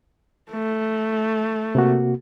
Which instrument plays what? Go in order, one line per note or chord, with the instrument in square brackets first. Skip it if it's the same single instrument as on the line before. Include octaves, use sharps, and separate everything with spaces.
[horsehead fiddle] A3
[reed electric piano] C3 A#3 F#4